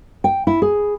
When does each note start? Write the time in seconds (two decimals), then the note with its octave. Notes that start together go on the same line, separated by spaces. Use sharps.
0.24 G5
0.47 E4
0.62 G#4